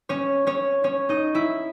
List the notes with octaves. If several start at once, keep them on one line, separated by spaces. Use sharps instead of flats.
C#4 C#5
C#4 C#5
C#4 C#5
D#4 D#5
E4 E5